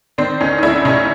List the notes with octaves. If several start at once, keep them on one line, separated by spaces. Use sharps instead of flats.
D#3 C4 D4
D2 C#4 D#4
D#4
D2 D4 E4
C3 C#4 D#4